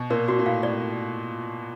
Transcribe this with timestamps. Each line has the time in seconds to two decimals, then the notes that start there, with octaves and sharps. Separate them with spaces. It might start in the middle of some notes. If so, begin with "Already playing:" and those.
Already playing: B2
0.10 A#2 A#4
0.28 A#2 F#4
0.39 A#2
0.46 A2 F5
0.63 A2 D5